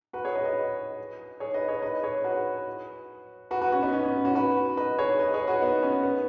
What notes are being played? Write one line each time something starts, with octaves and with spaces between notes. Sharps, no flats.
F#4 B4
G#4 C#5
B4 D#5
B4 D#5
G#4 C#5
B4 D#5
G#4 C#5
B4 D#5
G#4 C#5
F#4 B4
F#4 B4
F#4 B4
C#4 F#4
B3 D#4
C#4
C#4
C#4 F#4
F#4 B4
B4 D#5
G#4 C#5
B4 D#5
G#4 C#5
F#4 B4
B3 D#4
C#4
B3